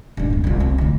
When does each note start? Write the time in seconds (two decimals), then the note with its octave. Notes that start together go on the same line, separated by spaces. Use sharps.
0.17 G2 D#4
0.30 E2 B3
0.44 C2 F4
0.60 C4
0.78 D2 E4